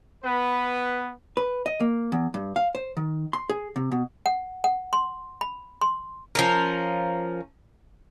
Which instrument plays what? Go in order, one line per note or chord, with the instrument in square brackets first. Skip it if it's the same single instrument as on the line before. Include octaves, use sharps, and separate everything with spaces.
[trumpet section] B3 B4
[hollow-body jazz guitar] B4
D#5
A#3
E2
G2
F5
C5
D#3
C6
G#4
C3
B2
[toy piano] F#5
F#5
C6
B5
C6
[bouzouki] F3 C#4 A#4